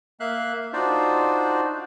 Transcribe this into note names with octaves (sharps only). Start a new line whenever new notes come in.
A#3 E5 F5 F#6
D4 D#4 F4 F#4 C5 D5